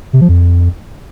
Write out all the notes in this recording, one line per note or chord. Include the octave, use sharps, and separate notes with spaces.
C3
F3
F2